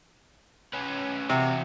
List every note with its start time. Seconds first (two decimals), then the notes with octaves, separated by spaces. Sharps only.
0.73 C#4 B4
1.29 C3 E3 F#4